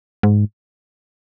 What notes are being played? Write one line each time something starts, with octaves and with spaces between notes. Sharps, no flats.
G#2